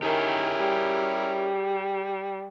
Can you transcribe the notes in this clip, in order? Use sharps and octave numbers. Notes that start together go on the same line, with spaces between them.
D#3 C#4 E4 G4 G#4 A#4
G3